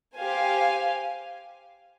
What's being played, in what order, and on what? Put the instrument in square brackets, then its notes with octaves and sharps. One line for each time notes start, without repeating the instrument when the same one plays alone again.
[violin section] G4 C5 F5 G#5